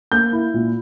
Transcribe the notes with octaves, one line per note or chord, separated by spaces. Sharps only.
A#3 G6
E4
A#2